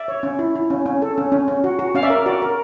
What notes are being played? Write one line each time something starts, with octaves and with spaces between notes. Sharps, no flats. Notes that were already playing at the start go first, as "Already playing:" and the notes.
Already playing: D5 E5
C#5
C#4
E4
E4
C#4
C#4
A4
C#4
C#4
C#4
F#4
F#4
C#4 F5
D5 E5
A#4
F#4 D5
A#4